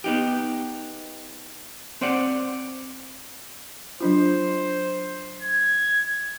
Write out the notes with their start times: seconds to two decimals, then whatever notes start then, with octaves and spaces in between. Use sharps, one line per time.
0.04 B3 D#4 G4
2.01 C4 C5 D5 F#5
4.00 F#3 D4 F4 C5
5.42 G#6